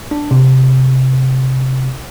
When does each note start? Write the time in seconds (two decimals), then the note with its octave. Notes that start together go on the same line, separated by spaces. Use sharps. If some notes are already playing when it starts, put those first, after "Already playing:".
0.11 D4
0.31 C3